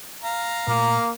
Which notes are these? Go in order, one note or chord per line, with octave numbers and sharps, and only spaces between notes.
F5 A#5
A#2 A3 A#3